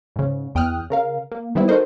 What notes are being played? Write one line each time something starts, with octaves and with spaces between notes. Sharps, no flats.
G#2 C#3
E2 G5 D#6 F6 F#6
C#3 A#4 F5
A#3
D#3 G3 B3 C4 E4
D#4 F#4 A4 A#4 C5 D#5